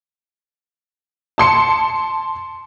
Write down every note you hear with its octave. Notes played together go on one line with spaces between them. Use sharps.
A5 C6 C#7